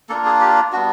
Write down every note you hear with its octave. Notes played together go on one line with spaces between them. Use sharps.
A#3 D4 F4 A4
G#4
G4
G3 B3 D4 F#4